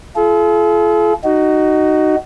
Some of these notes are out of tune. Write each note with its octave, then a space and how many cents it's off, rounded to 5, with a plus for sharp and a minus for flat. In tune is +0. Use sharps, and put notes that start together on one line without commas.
F4 -35 A4 -45
D#4 -10 F#4 +20